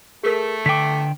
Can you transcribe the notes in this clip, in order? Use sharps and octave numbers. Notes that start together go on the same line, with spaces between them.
A3 G#4 A#4
D3 G5 D6 B6